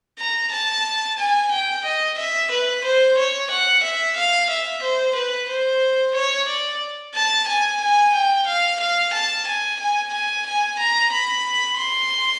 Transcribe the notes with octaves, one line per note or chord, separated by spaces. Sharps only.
A#5
A5
G#5
G5
D#5
E5
B4
C5
C#5
F#5
E5
F5
E5
C5
B4
C5
C#5
D5
A5
G#5
G#5
G5
F5
F5
A5
G#5
G#5
G#5
G#5
A#5
B5
C6